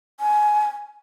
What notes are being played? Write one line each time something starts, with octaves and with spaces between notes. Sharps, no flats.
G#5